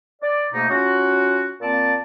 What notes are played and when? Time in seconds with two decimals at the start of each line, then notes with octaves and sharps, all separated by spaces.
0.22 D5
0.53 G#2 B2 A3 A#3 D#4
0.70 F#3 C#4 F4 F#4
1.61 A#2 A#3 C4 D5 A5